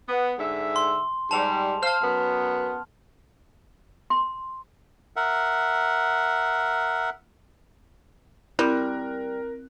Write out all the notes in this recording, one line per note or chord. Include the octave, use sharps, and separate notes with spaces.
B3
G#2 D3 E5
C6
G#2 G3 A5 F7
C5 F5 A5 F6
F#2 B3
C6
A#4 E5 F#5
G3 C4 E4 A#4 F#6 G6